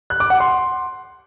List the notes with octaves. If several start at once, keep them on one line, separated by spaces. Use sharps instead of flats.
F#6
D6
F#5
C6